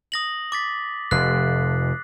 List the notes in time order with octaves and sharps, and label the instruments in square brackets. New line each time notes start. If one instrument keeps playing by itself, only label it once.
[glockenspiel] D#6 A#6 F#7
D6 A6 B6
[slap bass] F1 [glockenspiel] F#6 C7